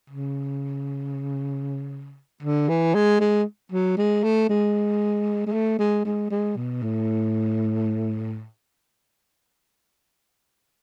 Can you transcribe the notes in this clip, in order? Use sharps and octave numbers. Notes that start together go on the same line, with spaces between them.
C#3
D3
E3
G#3
G#3
F#3
G#3
A3
G#3
G#3
A3
G#3
G#3
G#3
B2
A2